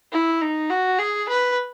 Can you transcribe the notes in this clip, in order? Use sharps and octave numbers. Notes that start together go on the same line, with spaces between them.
E4
D#4
F#4
G#4
B4